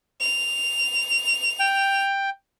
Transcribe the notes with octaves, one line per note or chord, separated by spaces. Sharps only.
F7
G5